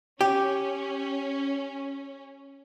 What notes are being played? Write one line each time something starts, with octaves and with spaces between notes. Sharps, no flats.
C#4 G4